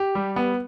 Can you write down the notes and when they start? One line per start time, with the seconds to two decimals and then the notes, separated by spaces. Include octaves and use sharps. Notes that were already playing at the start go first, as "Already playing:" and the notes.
Already playing: G4
0.15 G3
0.36 B3